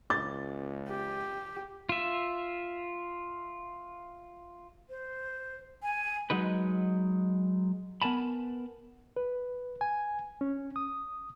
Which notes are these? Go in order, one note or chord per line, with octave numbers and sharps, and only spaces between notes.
C#2 D6 A6
G4
F4 E5
C5
G#5
F#3 G#3 D#4 B4
B3 A#4 G#5 A5 B5
B4
G#5
C#4
D#6